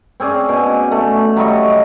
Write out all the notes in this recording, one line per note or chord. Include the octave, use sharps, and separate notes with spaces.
C4 C#4 G#4 D5
B2 G#5
A3
F#3 G3 D#5 C#6